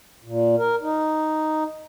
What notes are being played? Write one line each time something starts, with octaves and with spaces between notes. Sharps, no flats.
A#2
A#4
D#4